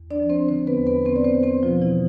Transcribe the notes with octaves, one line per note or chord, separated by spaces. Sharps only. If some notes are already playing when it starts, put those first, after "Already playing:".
Already playing: E2
D4 D5
F3
C4 C5
D3 C4 C5
B3 B4
E2
B3 B4
E2 C4 C5
D5
C4 C5
E2
C4 C5
B2 F3 F4
E3 E4
B2